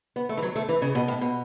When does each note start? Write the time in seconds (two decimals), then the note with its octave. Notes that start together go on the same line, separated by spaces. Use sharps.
0.16 B3
0.29 A3
0.37 E3
0.42 F#3
0.56 A3
0.69 E3
0.82 C#3
0.95 B2
1.08 A2
1.21 B2